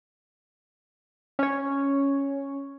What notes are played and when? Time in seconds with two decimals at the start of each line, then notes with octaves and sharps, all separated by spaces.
1.39 C#4 C#5